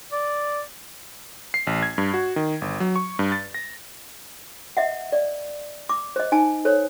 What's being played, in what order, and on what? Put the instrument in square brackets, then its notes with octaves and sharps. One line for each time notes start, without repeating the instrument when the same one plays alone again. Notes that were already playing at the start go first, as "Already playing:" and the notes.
[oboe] D5
[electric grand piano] C7
A1
G#6
G2
F#4
D#3
G1
F#3
C#6
G2
A6
A#6
[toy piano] D#5 E5 F#5
D5
D6
C5 D#5
D#4 G#5 A5
A4 C5 C#5